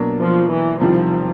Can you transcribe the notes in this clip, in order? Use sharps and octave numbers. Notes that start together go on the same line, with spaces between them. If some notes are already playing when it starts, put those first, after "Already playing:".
Already playing: B2 F#3 A#3 D4
F3
E3
E2 C3 D#3 F3 G3